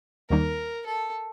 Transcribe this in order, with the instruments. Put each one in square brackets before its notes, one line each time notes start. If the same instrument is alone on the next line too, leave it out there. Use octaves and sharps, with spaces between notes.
[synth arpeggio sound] D#2 D#3 G3 A#3 D#4 [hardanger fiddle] A#4
[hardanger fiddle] A4